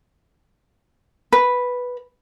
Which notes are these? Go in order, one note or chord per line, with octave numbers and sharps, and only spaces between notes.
B4